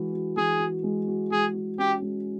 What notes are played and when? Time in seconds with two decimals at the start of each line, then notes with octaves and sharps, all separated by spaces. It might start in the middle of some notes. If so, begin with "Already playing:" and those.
Already playing: E3 G#3 F#4
0.13 F#4
0.37 E3 G#4
0.60 F#4
0.83 G#3
1.08 F#4
1.31 G#3 G#4
1.55 F#4
1.78 C#4 G4
2.02 G#3